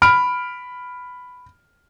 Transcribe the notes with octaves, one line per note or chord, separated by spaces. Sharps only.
B5 F6 D7